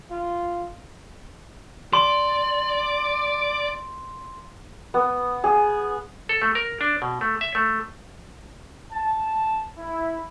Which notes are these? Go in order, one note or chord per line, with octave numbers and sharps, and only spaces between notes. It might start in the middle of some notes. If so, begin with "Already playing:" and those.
F4
D5 C6
B3
G#4
A4
A3
A#4
D4
B2
A3
E5
A3
A5
E4